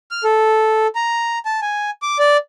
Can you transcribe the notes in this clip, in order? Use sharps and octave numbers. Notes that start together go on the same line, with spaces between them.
F6
A4
A#5
A5
G#5
D6
D5